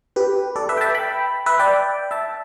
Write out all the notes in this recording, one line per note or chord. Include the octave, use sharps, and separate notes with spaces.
G4 B4
A4 D5
B4 E5
G5
E5 A5
G5 B5
B4 E5
D5 G5
E5 A5